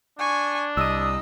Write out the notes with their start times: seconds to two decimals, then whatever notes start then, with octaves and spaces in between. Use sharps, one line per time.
0.19 D4 G#5 C#6
0.77 C2 D#5 D#6 E6